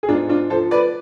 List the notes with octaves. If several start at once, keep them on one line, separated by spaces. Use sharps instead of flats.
G#4
G#2 D4 F4
D4 F4
F3 A4 C5
B4 D5